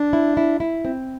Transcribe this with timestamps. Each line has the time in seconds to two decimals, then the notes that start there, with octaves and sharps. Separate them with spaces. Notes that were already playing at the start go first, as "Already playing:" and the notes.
Already playing: D4
0.13 E4
0.37 E4
0.60 E4
0.85 C4